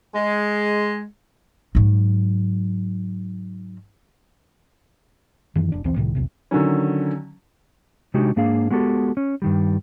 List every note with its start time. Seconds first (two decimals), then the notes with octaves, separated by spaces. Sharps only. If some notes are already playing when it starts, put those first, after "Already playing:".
0.15 G#3
1.75 G#2 F#3
5.55 F#2 D#3 E3
5.72 F1 D4
5.84 B1 E2 E3 C4
5.96 C2 A2 C3 D#3
6.15 B1 E2 C3
6.51 D3 D#3 F#3 C#4
8.14 C3 G#3 D4 D#4 F#4 G4
8.36 G#2 A#3 D4 G#4 F5
8.71 G#3 B3 F#4 G4 A4
9.17 C#4
9.42 G2 D#3 G3